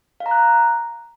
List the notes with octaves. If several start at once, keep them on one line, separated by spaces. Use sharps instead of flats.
F5
A#5
F#6